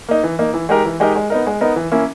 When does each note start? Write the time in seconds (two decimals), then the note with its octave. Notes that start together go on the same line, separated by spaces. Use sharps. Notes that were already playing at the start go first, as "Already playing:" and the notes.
0.09 A#3 D#4
0.24 E3
0.39 A#3 D#4
0.54 E3
0.69 G#3 D#4 G4 A#4
0.85 E3
1.00 G#3 D#4 G4 A#4
1.15 G#3
1.30 B3 D#4 A#4
1.47 G#3
1.61 B3 D#4 A#4
1.76 E3
1.92 A#3 C#4 E4